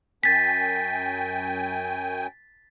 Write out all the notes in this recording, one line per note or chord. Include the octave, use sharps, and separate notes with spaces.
F#2 G5 G#5 A6 B6